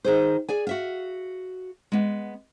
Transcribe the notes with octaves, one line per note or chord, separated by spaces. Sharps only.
D#3 G#4 C5
G#4 D5 G#5
F#4 E5 F5
G#3 B3